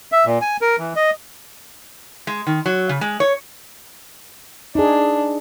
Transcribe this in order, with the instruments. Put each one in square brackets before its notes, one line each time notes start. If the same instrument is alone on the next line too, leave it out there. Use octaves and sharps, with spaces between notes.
[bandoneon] E5
A#2
G#5
A#4
E3
D#5
[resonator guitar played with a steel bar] G#3
D#3
F#3
C#3
G#3
C#5
[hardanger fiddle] D4 [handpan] D#4 G#4